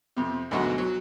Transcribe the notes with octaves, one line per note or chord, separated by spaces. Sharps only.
F2 C3
D2 G#2 B2 F#3 D#5 F#5
F#3